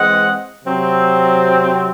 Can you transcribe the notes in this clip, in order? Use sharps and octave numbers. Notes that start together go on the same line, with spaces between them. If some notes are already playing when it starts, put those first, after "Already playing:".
Already playing: E3 G#3 C4 D#5 F#5
C3 F#3 C4